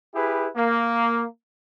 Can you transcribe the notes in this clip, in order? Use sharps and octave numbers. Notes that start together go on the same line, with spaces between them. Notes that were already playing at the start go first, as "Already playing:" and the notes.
E4 G4 G#4 B4
A#3